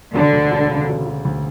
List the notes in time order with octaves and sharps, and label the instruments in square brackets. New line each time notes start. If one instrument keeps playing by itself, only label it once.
[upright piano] E1 [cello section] D3
[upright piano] D2
E1
C#3
E1
E1
D2